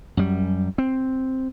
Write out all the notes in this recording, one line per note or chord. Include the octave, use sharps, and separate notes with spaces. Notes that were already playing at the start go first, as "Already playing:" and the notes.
F#2 G3
C4